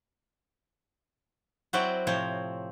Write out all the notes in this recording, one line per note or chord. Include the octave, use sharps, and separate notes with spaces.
F#3 C4 E4 F#4 D5
A2 C3 F3 C4 C#5